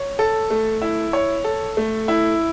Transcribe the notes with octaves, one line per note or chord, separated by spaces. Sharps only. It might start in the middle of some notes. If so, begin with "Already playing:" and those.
Already playing: C#5
A4
A3
E4
C#5
A4
A3
E4